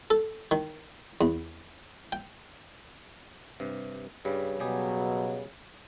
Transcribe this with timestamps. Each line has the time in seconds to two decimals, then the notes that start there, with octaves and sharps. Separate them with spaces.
0.10 A4
0.51 D#3
1.21 E2
2.12 G5
3.60 G2 C3
4.25 G2 C#3 G3
4.60 B2 F#3 G3 G4 G#4